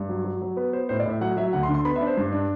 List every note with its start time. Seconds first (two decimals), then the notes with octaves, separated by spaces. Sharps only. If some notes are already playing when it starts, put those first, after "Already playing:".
Already playing: G2
0.09 F#3
0.25 F#3
0.42 F#3
0.57 B3 B4
0.73 B3 C5
0.89 A2 C5
1.00 D5
1.05 A2 E5
1.21 F#3 F#5
1.37 F#3 E5
1.53 D2 F#5
1.63 C6
1.69 D3
1.74 C6
1.85 B3 B5
1.96 E5
2.01 D4
2.07 C5
2.17 G2
2.33 D4